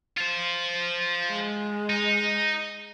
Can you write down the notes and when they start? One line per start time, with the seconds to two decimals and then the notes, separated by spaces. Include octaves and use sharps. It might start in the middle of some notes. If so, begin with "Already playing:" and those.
0.18 F4 C5
1.31 G#3
1.90 D#4